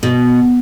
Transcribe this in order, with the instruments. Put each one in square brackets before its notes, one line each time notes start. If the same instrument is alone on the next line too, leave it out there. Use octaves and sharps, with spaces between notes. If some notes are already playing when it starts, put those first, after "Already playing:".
[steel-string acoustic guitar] B2